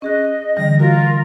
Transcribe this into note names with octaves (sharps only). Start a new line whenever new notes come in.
C#4 G#4 D#5 F#6
D3 E3 G3 A#6
F4 F#4 A#4